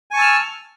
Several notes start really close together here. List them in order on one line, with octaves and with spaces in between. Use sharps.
G#5 C#6 A5 E6 F6